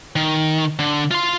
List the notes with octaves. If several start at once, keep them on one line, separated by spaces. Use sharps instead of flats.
D#3
D3
F4 C6